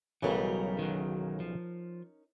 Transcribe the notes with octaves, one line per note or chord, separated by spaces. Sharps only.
B1 C#3 E3 F#3 G3 C#4 D#4 A#4
D#3 F#3
F3